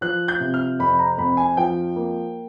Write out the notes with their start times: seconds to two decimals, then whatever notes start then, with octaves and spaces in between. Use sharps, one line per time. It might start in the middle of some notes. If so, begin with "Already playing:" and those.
0.01 F3 F#6
0.28 G6
0.40 C3
0.54 F6
0.79 F2 B5
0.99 A#5
1.18 F2 B5
1.37 G#5
1.56 F3 G5
1.96 A#3